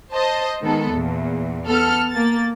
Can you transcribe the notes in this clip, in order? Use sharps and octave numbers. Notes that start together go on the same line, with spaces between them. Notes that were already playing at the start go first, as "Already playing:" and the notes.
C5 D#5 A5
D#3 G#3 B3 A4
E2 A#2
B3 A4 F6
A#3 A6